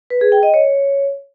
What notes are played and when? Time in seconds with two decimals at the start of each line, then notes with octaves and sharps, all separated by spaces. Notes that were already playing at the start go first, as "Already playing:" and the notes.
0.10 B4
0.21 G#4
0.32 G5
0.43 D#5
0.54 C#5